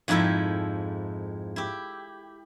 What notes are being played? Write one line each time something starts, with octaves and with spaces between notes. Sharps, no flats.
F2 G#2 F3 E4 A4 G5
E4 G4